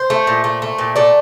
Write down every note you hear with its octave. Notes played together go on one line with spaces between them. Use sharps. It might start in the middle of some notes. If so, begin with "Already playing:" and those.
Already playing: C5
A3
A#2
A3
A3
A#2
A3 D5